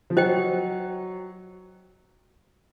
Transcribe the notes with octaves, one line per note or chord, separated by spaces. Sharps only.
F3
F#3 C5 D#5 G5